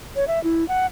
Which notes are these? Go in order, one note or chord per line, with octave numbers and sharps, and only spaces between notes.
C#5
E5
E4
F#5